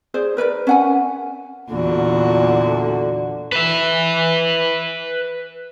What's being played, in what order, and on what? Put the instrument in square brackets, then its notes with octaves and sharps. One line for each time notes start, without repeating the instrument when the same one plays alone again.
[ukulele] G#4 C5 D5
A#4 B4 C#5 D5
C#4 F#5 G#5
[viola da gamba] E2 A#2 F#4 [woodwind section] D3
[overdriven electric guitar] B4 E5